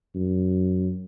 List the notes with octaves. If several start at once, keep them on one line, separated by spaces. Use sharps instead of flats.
F#2